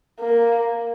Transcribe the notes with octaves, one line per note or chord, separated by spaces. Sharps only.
A#3